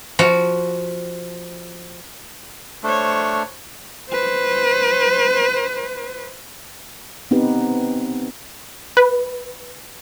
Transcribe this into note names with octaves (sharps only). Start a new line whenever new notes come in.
F3 F#4
A3 D4 C5 C#5
B4 C5
B3 C4 D#4 G4 B4
B4